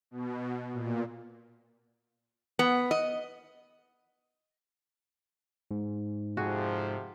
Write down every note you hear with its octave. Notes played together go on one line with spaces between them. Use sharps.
B2
A#2
B3
D#5
G#2
F2 C3 F3 F#4 G#4